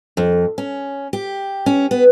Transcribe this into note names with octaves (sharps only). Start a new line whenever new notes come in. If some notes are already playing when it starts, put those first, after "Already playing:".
F2
C#4
G4
C#4
B3